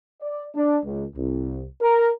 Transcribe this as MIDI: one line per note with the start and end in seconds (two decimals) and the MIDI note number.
0.22 0.46 74
0.55 0.78 62
0.85 1.05 37
1.17 1.64 36
1.82 2.10 70